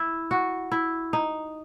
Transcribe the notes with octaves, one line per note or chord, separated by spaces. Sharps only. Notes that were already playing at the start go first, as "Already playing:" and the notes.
Already playing: E4
F#4
E4
D#4